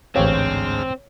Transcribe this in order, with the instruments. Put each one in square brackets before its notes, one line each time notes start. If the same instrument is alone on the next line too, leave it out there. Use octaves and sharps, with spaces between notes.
[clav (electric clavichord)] A1 G4 F5 [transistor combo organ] D2 G#2 F6 [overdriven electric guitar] C4 [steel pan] C#5